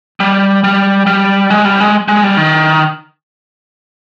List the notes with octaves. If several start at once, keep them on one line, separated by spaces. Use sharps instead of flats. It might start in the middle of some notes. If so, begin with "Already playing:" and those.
G3
G3
G3
G#3
G3
G#3
G#3
G3
D#3